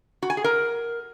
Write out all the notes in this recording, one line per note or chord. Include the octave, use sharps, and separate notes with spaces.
F#4
G#5
G#4
A#4